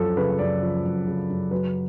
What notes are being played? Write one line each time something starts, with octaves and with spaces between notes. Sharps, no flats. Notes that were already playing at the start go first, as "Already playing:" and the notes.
Already playing: F#2 F3 A4
C#3 B4
F#2 D5
F3
F#2
C#3
F#2
F#3 B4